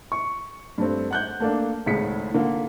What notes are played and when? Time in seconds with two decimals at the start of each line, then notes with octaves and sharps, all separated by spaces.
0.12 C#6
0.78 G2 A3 C4
1.11 F#5 F#6 G6
1.40 A3 A#3 D4
1.86 G#1 C#2 A2 G#4 B6 C#7
2.34 D3 A#3